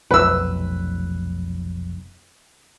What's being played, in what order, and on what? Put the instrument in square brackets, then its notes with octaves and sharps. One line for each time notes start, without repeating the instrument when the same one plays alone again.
[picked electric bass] F1 B1 [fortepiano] B4 E6